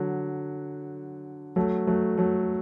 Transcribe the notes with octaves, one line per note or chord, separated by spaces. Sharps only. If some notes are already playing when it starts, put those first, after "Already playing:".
Already playing: D3 F#3
F#3 A3
F#3 A3
F#3 A3